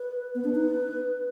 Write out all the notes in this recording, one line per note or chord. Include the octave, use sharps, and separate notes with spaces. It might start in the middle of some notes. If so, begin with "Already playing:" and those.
Already playing: B4
B3 B4
D4
D#4